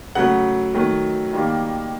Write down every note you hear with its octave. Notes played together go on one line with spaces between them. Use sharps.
C#3 F#3 A3 F#5
D#3 F#3 A3
D#3 G3 A#3